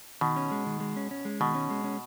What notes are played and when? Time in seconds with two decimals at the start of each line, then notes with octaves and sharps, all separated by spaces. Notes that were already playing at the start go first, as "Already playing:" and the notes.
0.21 B2 D#3
0.36 C#4
0.51 G#3
0.66 D#3
0.80 G#3
0.96 C#4
1.11 C#4
1.25 G#3
1.40 B2 D#3
1.55 C#4
1.70 G#3
1.84 C#4